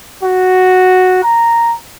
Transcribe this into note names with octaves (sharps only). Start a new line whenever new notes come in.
F#4
A#5